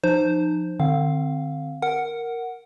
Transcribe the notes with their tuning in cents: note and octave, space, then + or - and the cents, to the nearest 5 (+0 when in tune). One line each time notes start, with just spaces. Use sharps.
F3 +5 D#4 -25 C5 +0
D3 +45 C4 +0 F5 +0
A#4 +0 F#5 +0